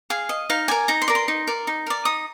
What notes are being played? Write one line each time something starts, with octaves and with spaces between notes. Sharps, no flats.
G#4 F5
D#5
D#4 F5
A#4 D5 G#5
D#4 A#5
C6
A#4 D5
C6
D#4
A#4 D5
D#4
A#4 D5
D#4 D#6